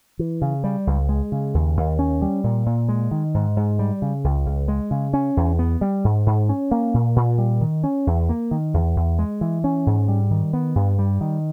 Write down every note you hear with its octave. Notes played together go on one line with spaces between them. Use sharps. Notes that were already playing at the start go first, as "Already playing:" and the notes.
E3
C#3
G3
C#2
G#3
C#3
D#2
D#2
C#4
G3
A#2
A#2
G#3
D#3
G#2
G#2
G3
C#3
C#2
C#2
G#3
C#3
C#4
E2
B3
G3
G#2
G#2
C#4
A#3
A#2
A#2
G3
D#3
C#4
E2
A#3
D#3
E2
E2
G#3
E3
C#4
G#2
G3
D#3
B3
G2
G3
D#3